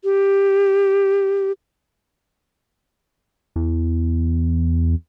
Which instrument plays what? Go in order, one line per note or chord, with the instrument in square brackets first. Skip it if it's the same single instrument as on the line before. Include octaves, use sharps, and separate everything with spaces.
[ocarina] G4
[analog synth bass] E2